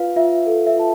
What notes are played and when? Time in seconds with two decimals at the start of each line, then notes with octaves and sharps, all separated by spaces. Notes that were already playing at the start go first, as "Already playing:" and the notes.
Already playing: F4 B4 F5
0.16 F4 E5
0.46 A4
0.67 E5
0.76 F4 A5